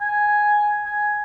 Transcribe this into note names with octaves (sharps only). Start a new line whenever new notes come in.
G#5
G#5